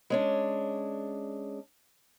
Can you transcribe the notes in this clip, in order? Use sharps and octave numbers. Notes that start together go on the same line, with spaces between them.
G#3 C#4 D4